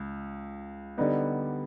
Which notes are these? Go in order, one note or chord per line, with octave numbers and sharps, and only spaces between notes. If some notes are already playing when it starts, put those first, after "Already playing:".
Already playing: C#2
D3 G3 B3 D#4